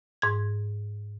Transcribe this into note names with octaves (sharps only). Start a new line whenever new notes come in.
G#2 G#6